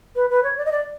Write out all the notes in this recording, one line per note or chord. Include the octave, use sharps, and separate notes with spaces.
B4
B4
C#5
D5
D#5
D5